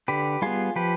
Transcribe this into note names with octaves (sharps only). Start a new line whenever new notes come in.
D3 G4 B4
G3 B3 F4 G#4
F3 G4 B4